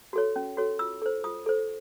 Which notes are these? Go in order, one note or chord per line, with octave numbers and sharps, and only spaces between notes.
F#4 A4 C#5
C#4
F#4 A4 C#5
F4 E6
A4 C5
F4 D#6
A4 C5